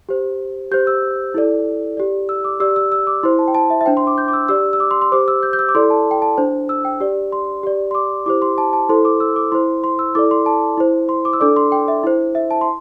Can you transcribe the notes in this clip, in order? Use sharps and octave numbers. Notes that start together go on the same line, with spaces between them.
G4 C5
G4 C5 G6
E6
E4 A4 D5
G4 D5
E6
D6
G4 D5 E6
E6
E6
D6
E4 C5 C6
A5
G5
A5
E5
E5
D4 C5 G5
C6
D6
G6
D6
E6
G4 D5 E6
E6
D6
C6
C6
G4 C5 D6
E6
G6
G6
E6
D6
E4 A4 D5 C6
A5
G5
A5
D4 C5
E6
G5
G4 D5
C6
G4 D5
C6
D6
E4 G4 C5 D6
C6
A5
A5
E4 A4 C5 C6
D6
E6
D6
E4 C5 C6
C6
E6
E4 A4 D5 D6
C6
A5
E4 C5
C6
D6
E6
D4 A4 D5 D6
C6
G5
E5
E4 C5
E5
A5
C6